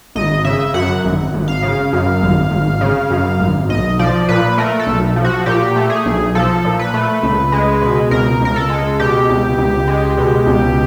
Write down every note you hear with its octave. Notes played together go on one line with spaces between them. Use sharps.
G#1 D#5
C#3 E5
F#2 F#5
G#1
G#1
F5
C#3
F#2
G#1
G#1
C#3
F#2
G#1
B1 D#5
F3 D5
A#2 B4
A3 A#4
A4
B1
F3
F#4
A#2 G4
A3
G#4
B1
F3 A4
A#2
B4
A3
C#2
G#3
B2
C#2 A#4
C#2 A#4
A4
G#3
B2 G4
C#2
C#2
G#3
B2
C#2